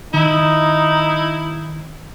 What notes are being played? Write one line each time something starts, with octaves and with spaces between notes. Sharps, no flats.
D#3 D#4 E4